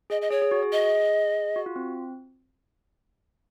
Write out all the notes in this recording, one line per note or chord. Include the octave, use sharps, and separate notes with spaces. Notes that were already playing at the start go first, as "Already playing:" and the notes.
G#4 D#5
D#5
G#4 C#5
G#4
F#4
G#4
D#5
F#4
F4
C4